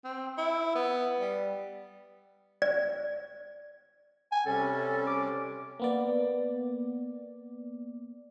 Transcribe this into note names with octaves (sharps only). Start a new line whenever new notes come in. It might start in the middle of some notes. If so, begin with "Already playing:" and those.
C4
E4
B3
G3
D5
G#5
C3 G3 C#4 A4
D6
A#3 B3 D5